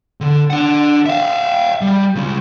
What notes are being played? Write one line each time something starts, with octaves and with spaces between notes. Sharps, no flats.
D3
D4 F#5
E5 F5
G3
C#2 C#4